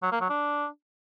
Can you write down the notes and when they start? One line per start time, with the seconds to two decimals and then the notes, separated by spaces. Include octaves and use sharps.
0.03 F#3
0.12 A#3
0.21 F#3
0.30 D4